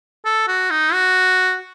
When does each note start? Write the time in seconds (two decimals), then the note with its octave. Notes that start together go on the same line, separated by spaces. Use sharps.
0.25 A4
0.48 F#4
0.70 D#4
0.93 F#4